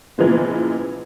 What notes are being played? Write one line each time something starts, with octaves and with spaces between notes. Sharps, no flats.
A#2 C#3 E3 F3 G#3 B3